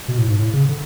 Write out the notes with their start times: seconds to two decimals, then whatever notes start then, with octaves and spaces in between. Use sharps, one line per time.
0.08 B2
0.18 A2
0.28 G#2
0.38 A2
0.53 C#3
0.69 D3